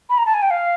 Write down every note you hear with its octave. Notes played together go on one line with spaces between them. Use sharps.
B5
A#5
A5
G#5
G5
F5